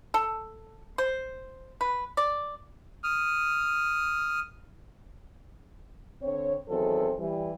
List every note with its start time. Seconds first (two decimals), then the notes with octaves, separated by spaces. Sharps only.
0.14 A4
0.98 C5
1.81 B4
2.17 D5
3.04 D#6 F6
6.22 D3 C4 C#5
6.69 E2 D#3 F#3 C4 A4
7.19 E3 G3